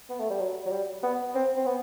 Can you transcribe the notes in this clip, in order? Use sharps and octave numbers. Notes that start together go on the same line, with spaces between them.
B3
A3
G3
F#3
F#3
G3
B3
C4
C4
B3